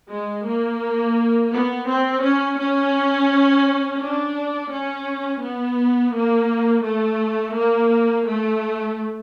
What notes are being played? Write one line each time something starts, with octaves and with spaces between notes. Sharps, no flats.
G#3
A#3
B3
C4
C#4
C#4
D4
C#4
B3
A#3
A3
A#3
A3